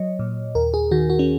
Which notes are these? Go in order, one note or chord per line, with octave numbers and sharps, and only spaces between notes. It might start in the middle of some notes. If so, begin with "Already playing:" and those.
Already playing: F#3 C#5 D#5
A#2
D#2 A#4
G#4
D#3 F#4
F#4
C#4